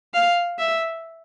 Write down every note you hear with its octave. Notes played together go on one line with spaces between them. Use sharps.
F5
E5